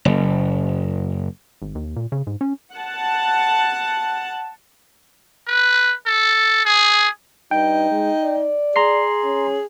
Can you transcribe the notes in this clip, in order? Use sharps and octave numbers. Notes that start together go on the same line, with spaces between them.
F#1
G#1
D#2
A#2
C#3
G#2
C#4
F#5 A5
B4
A4
G#4
G2 D#4 G5
G#3
D5
G#4 A#5 C6 C7
C#4